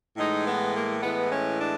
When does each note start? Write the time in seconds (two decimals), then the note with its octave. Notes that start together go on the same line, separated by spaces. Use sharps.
0.17 A2 E3 G#3 D#4
0.45 B3
0.74 A#3
1.02 A2 E3 G#3 B3
1.31 C#4
1.60 D4